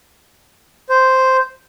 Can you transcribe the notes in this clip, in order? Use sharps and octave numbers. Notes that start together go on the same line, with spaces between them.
C5